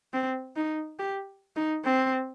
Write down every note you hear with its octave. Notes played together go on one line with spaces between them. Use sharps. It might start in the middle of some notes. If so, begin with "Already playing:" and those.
C4
D#4
G4
D#4
C4